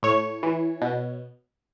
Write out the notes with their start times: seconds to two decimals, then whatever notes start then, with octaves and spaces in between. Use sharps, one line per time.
0.03 A2 C#5
0.43 E3
0.81 B2